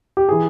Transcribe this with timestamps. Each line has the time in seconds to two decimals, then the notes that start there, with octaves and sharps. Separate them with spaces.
0.17 G4
0.29 E3 G#4